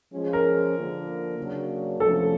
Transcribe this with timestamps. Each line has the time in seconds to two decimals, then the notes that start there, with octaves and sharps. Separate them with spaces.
0.12 F3 G#3 C#4 F4 G#4
0.33 A#4
0.75 D3 F3 A#3
1.37 C#3 F#3 A#3 D4
2.00 E2 C3 F3 A3 C#4 A4